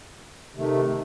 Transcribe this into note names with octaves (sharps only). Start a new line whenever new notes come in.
C3 D#3 A3